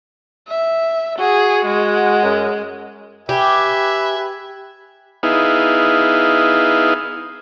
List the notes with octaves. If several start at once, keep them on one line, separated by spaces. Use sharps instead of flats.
E5
F#4 G#4
G#3
F#2
G4 B4 E5 G#5
B3 D#4 E4 G#4 F5